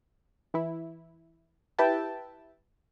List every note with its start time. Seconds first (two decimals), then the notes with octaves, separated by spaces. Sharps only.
0.54 E3 E4
1.79 E4 G4 B4 E5 G5 A5